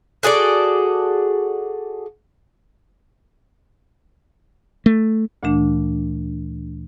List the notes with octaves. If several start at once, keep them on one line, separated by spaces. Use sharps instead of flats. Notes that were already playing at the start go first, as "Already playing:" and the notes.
F#4 G#4 A4 D5
A3
D2 A#2 E3 A3 D4